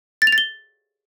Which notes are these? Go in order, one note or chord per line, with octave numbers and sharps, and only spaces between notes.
A6
F7
A6
G7